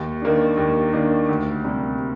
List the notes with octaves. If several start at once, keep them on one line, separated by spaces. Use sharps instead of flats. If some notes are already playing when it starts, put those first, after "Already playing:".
Already playing: D#2
D#3 A#3 D4
D#2
D#3 A#3 D4
D2
C3 G3